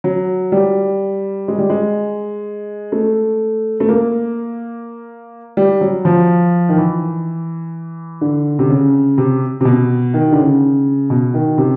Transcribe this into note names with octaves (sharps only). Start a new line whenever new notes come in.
F#3
G3
G#3
G3
G#3
A3
A3
A#3
G3
F#3
F3
D#3
E3
D3
C3
C#3
C3
C3
B2
D#3
D3
C#3
B2
D#3
C3